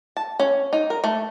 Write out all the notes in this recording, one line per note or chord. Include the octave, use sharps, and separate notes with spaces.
A5
C#4
D#4
A#4
A3